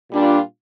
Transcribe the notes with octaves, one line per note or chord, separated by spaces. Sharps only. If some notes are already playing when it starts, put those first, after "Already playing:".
A#2 G3 D4 F4